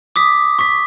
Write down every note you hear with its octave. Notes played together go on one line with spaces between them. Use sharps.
D6 D#6 B6
C#6 B6